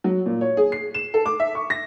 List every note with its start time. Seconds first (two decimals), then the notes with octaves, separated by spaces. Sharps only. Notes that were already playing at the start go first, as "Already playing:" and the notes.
0.04 F#3
0.26 A#2
0.41 C#5
0.57 G#4
0.72 C7
0.94 E7
1.14 A4
1.26 D6
1.40 E5
1.55 C#6
1.70 A#6